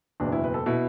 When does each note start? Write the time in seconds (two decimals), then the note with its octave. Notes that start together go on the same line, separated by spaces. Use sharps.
0.20 F#1 E2 B2 D4
0.32 E4
0.44 B4
0.54 A4
0.66 B2 E4